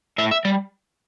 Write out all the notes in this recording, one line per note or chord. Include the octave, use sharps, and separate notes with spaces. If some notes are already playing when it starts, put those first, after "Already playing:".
A2 E5
E5
G3 D5